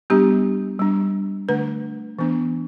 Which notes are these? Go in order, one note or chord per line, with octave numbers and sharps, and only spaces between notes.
G3 B3 D4 G4
G3 D4
D3 A3 D4 B4
E3 B3 D4